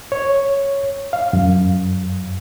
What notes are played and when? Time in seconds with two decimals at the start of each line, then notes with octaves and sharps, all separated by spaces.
0.12 C#5
1.13 F5
1.33 F#2